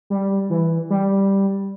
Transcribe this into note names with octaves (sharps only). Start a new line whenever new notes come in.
G3
E3
G3